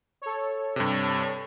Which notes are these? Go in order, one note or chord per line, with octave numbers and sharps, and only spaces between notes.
A4 C#5
G2 C3